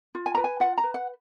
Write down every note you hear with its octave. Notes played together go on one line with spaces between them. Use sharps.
F4
G#5
B4 A#5
G#5
F4 F#5
A#5
B4
F#5